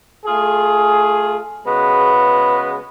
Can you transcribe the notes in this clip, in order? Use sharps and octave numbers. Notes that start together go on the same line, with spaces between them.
A3 F4 G#4
C#3 G#3 B3 F#4 B4